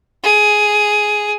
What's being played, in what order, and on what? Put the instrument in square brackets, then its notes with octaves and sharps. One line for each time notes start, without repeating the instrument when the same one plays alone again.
[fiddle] G#4